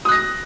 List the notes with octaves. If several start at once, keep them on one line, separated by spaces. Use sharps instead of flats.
D#6 F#6 A#6